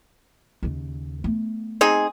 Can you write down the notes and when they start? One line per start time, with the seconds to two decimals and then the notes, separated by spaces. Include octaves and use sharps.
0.63 D#2 C#3
1.24 A3 B3
1.81 C4 D#4 G#4